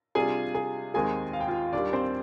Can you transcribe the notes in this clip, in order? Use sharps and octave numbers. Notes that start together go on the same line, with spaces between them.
C3 G3 D4 F4 G#4 G#5
G#4 G#5
D#2 D#3 G#3 C4 D#4 G#4 G#5
F5
G5
F4 F5
D#2 D#3 G3 D4 D5
C4 C5